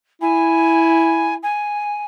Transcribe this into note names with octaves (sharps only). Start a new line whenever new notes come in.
E4 G#5
G#5